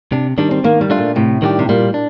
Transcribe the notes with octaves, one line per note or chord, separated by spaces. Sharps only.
C3 D4
D#3 G3 D4
C4
D#3 A#3
G3
A3 D4 F4
A#2
A2 C3
D#3 G3 D4 G4
C3
A#2 G3
D4